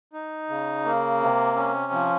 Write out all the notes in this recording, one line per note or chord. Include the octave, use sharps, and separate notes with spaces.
D#4
C#3
A#3
C3
C#4
F3